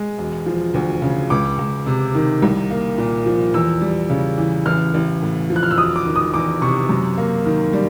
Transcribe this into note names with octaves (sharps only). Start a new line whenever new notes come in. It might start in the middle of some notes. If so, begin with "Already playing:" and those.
Already playing: G#3
E1
F3
D2
C#3
C#2 D6
C#2
C3
D#3
C2
A#3
A#2
F3
E2 E6
G3
C#3
E3
A1 F6
A1
A2
F3
F#6
F6
E6
E1 D#6
D6
D#3
D#6
E2 D6
C3 C#6
F#2
A#3
D#3
G3